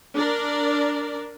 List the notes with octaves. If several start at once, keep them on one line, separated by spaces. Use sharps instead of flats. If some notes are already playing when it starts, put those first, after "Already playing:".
D4 A#4 D5